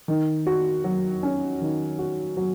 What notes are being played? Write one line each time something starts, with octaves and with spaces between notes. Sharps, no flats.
D#3
F#4
F#3
C#4
D#3
F#4
F#3